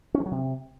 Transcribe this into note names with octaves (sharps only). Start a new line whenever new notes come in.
C#4
F3
F#3
C3